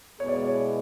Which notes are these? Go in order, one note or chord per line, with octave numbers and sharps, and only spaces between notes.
B2 G#3 B3 E4 G#4 C#5
D5
C#5